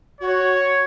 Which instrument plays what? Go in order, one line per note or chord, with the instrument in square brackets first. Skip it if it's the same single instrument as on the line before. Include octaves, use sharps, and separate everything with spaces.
[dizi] F#4 [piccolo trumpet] C#5